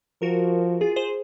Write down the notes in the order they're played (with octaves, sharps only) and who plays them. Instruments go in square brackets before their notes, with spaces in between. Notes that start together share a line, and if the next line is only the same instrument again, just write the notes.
[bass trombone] F3 [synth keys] F#4 A#4
[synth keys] F4 G#4
G#4 C5